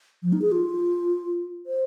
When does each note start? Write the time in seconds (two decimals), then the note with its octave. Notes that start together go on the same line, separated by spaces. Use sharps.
0.23 F3
0.33 D#4
0.42 G#4
0.52 F4
1.66 C5